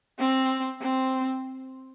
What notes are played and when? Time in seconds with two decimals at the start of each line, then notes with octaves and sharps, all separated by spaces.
0.19 C4
0.81 C4